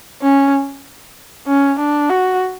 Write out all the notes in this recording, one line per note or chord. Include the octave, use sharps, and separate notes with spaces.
C#4
C#4
D4
F#4